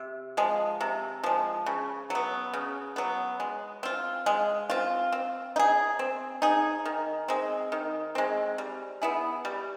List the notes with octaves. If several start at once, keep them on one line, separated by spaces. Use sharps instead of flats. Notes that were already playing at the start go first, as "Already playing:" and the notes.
Already playing: C3
F3 G#3
C3
F3 G#3
C#3
F#3 B3
C#3
F#3 B3
G#3
C4 F4
G#3
C4 F4
C4
D#4
G#4
C4
D#4 G#4
D#3
G#3 C4
D#3
G#3 C4
G3
B3 E4 G#4
G3